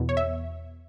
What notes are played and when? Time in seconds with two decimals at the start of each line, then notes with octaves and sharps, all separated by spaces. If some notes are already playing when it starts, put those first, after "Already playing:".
Already playing: E2 B2 B3
0.09 C#5
0.17 E5